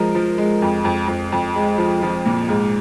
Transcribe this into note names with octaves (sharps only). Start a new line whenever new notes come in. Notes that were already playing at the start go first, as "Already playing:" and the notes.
Already playing: F3 G#3 A#4
F3
G#3
F2
F2
F2
F2
G#3
F3
F3
A#2
G#2